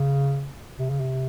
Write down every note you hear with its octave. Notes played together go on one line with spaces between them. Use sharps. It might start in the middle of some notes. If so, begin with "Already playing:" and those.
Already playing: C#3
C3
C#3
C3